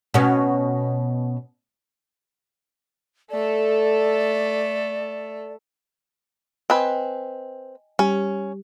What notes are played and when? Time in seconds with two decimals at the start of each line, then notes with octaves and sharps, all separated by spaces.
0.14 B2 C#4
3.31 A3 A4 D5
6.70 C4 B4 D#5 G5 G#5
7.99 G3 C#4 G4